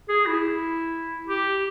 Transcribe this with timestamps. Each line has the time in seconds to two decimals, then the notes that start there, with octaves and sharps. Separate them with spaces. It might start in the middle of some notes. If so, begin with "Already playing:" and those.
0.09 G#4
0.27 E4
1.28 G4